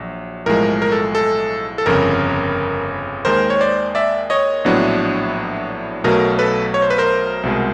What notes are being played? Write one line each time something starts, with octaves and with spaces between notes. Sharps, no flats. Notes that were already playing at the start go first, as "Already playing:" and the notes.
Already playing: A#1 F#3
B1 A2 F3 G#3 A#4
A#4
A4
A4
A4
G1 F2 C#3 A#4
D#2 D#3 G#3 A#4 C5
C#5
C5 D5
D5 E5
C#5 D#5
A#1 A2 F#3 B3 D4
B1 B2 F#3 A3 A#4
A4 B4
C#5
C5
B4
A#4 C5
C2 B2 G#3